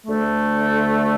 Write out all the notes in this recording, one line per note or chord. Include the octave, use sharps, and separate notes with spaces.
D2 D3 A3